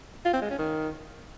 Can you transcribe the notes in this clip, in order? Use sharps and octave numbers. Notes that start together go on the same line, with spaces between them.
F4
C4
G#3
C#4
D#3